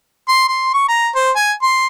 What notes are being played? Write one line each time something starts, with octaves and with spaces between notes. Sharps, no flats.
C6
C6
C#6
A#5
C5
G#5
C6